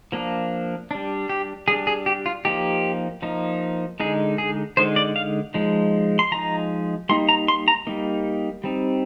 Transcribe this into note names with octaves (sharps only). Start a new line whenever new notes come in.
F3 A#3 D4
G3 D4
G4
G3 D4 G#4
G#4
G4
F4
F3 A#3 D#4 G4
F3 A#3 D#4
D3 G#3 D#4 G#4
G#4
D3 G#3 D#4 C5
D5
F5
F3 G#3 D#4
C6
F3 G#3 D#4 A#5
G3 A#3 D#4 C6
A#5
C6
A#5
G3 A#3 D#4
G3 C4 D#4